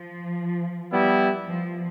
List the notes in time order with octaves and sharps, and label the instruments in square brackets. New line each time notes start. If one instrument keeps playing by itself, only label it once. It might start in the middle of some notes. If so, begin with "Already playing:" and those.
Already playing: [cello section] F3
[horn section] G3 B3 E4
[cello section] F3